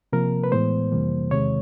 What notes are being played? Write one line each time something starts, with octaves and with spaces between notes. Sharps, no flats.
C3 F3 A#3 A#4
B4
A2 E3 G#3 B3 C5
F2 C3 E3 G3 A#3
E2 C3 D#3 G#3 C#5